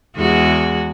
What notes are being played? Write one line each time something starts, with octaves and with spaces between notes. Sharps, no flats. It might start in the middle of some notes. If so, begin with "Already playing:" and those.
E2 G#3 F#4